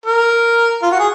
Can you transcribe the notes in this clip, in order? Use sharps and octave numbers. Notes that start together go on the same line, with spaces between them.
A#4
F4
F#4
G#4